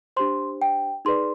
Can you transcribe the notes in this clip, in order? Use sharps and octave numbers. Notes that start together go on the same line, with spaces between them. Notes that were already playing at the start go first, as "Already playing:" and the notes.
D4 G4 C5 C6
G5
D#4 G#4 B4 D5 C6